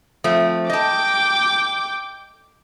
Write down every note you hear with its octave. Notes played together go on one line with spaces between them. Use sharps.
F3 A3 C4
D#5 G5 A5 D6